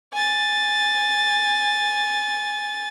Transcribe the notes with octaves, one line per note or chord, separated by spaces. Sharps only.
G#5 A6